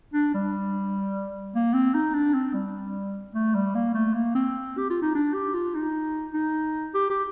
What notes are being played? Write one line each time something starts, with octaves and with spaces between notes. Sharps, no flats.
D4
G3
A#3
C4
D#4
D4
C4
G3
A3
G3
A#3
A3
A#3
C4
G4
F4
D#4
D4
G4
F4
D#4
D#4
G4
G4